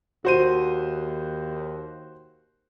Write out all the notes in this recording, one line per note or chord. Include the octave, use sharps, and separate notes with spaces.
D#2 F#4 C5 D#7